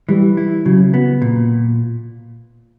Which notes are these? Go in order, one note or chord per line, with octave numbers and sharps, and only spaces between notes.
E3 G3
E4
C#3 F#3
B3
A#2